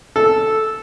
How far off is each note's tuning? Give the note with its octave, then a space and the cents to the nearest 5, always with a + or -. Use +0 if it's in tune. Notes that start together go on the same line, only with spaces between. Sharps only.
A4 -5